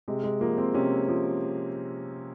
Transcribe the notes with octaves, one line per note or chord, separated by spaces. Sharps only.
C3 G#3
G#3
F3 A#3
C4
C3 C#4
F3